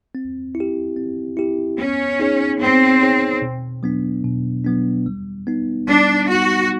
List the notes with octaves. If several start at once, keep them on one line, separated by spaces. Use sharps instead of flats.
C4
E4
G4
C4
E4 G4
B3 C#4
D#4 G#4 C#5
B3 C4
D#4 G#4 C#5
B2
F#3 B3 D4
B2
F#3 B3 D4
G3
B3 D#4
G3 D4
B3 D#4 F#4